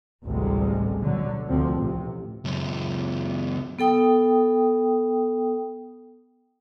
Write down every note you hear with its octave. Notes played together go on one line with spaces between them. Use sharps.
A1 D2 A2 C3 G3 G#3
B2 D3 F#3
D2 C3 F3 C4
A1 C3
C#2 F#2
B3 A4 G5 D#6